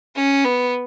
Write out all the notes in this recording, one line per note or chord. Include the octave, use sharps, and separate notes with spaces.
C#4
B3